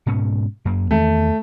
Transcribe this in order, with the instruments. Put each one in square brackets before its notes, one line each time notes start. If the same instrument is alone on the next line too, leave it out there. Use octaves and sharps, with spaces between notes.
[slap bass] G#2 B2 C#4
F#2 A#3
[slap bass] E2 D#3 [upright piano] A3